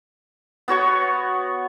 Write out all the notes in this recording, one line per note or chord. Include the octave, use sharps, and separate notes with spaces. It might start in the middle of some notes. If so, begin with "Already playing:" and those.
B3 F#4 C#5 C#6